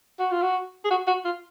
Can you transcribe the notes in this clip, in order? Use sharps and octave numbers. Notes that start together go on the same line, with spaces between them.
F#4
F4
F#4
G#4
F#4
F#4
F4